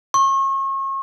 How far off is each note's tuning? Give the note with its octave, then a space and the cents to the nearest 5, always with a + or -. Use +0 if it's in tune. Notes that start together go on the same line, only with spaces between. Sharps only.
C#6 -35